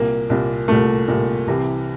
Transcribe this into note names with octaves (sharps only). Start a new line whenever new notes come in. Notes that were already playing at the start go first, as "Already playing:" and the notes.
Already playing: C2 A#2 A#3
C2 A#2
C2 A#2 A3
C2 A#2
C2 C3 E3